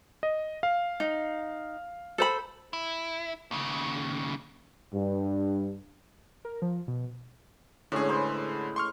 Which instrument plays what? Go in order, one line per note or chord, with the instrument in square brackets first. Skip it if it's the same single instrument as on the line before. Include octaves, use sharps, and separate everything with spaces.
[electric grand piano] D#5
F5
[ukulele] D#4
A4 C5 B5
[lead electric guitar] E4
D#2 C#3
[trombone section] G2
[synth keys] A#4
F3
B2
[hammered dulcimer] A2 G#3 C#4 [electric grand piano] D3 G#4
[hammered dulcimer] B4 C5 B5
[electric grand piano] C6 C#6 F6